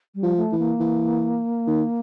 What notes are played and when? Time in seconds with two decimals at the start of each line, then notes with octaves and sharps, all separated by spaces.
0.15 G3
0.23 F3
0.37 A3
0.52 E3
0.59 A#3
0.80 E3
1.67 D#3